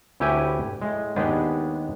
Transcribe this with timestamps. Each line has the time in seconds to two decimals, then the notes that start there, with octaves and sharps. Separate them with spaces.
0.20 D2 E4 G4 B4 C#5 G#5
0.82 A2 G#3
1.16 D#2 G#3 B3 D4 G4 G#4